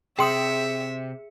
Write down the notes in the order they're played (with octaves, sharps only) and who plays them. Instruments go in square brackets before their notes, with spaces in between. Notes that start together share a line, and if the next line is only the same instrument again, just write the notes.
[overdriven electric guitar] C3 [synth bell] G#4 C#7 [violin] E5 [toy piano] G5 C6 D#6